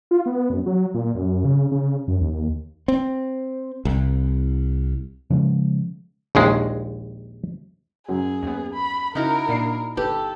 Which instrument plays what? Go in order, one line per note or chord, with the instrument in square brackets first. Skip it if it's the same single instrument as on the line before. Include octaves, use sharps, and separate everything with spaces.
[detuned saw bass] F4
B3
F#2
F#3
A#2
F#2
C#3
C#3
F#2
D#2
[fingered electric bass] C4
C2
[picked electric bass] C#3 F3 G3 G#3
[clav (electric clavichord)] A#1 D#2 G#3
[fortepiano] F#2 [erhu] G#4
[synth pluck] D#2 B3
[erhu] B5
[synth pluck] C#3 F6 A#6 [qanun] D#4 E4 F#4 [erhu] A#4
[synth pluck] A#2 D4 C7
[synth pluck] G1 [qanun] G4 [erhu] A4 [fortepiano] B4